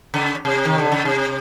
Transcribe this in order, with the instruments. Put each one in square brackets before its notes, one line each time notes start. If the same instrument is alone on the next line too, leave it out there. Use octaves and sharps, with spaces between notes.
[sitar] C#3
C3
D#3
D3
C#3
C3